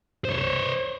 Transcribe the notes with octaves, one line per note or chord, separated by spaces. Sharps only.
C5 C#5